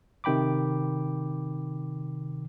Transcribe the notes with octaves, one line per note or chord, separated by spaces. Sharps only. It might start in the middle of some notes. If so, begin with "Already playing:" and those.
C3 D#3 G5 B5 D6